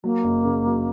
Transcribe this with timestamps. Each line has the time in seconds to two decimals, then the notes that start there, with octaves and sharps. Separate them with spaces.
0.04 F#3 A#3
0.24 F#1
0.44 C#3
0.66 F#3